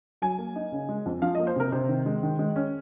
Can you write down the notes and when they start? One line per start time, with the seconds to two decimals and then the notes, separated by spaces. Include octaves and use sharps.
0.22 F#3 G#5
0.38 A#3
0.56 D#4
0.72 C#3
0.89 G#3
1.06 F2
1.22 F3 F5
1.35 D#5
1.40 A#3
1.47 C5
1.56 C3 A#4
1.72 C3 C5
1.89 D#3
2.06 G#3
2.23 D#3
2.39 G#3
2.56 C#4